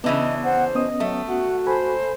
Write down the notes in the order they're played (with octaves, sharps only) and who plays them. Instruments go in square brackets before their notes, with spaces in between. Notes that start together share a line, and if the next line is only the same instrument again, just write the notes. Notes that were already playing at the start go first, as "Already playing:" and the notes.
[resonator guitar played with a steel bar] C#3 E3 D4 [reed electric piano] B3 [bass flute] D#5
[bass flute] C5 [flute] F#5
[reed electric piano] B3 C#4 D#6 [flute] D#5
[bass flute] F#3 [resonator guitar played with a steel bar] A3
[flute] F#4 [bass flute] F#5
[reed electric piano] A4 G#5 B5 [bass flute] C5